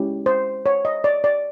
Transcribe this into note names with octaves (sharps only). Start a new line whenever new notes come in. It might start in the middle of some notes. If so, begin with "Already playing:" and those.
Already playing: G#3 C#4 E4 G4
C5
C#5
D#5
D5
D5